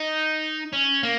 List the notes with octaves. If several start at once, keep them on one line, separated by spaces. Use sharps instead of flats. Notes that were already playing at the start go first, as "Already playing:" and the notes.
Already playing: D#4
C#4
A#3